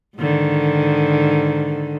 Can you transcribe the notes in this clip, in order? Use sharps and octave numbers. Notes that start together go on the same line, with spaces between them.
G#2 D3 D#3